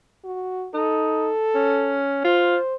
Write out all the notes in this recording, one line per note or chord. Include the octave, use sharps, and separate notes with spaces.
F#4
D#4 A4
C#4
F4 C5